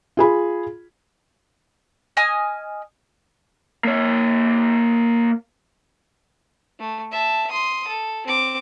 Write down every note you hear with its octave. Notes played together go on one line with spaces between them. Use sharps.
F4 G#4 B5
D#5 G#5 D#6 F6
A#3 C#5
A3
E5 A5
C6 D#6
A4
C4 D6